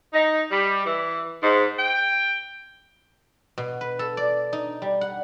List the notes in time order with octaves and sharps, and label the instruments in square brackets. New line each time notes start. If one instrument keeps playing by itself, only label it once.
[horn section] D#4
G3
E3
G#2
G5
[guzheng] B2
B4
A4
D5
D#4
G3
F#5